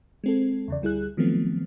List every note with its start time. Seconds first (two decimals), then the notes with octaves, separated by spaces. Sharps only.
0.24 G#3 C4 A4
0.68 E2 C#3 D5
0.82 D2 G3 E4 G#4 F#6
1.17 D#3 F3 F#3 A3 B3 C4